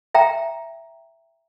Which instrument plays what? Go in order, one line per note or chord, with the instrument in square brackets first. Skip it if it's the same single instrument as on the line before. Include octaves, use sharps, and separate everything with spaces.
[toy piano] E5 G5 A#5